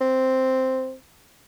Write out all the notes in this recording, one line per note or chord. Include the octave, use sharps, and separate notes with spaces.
C4